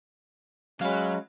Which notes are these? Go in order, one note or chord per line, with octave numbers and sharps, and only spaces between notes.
F#3 G#3 C#4 B4 F5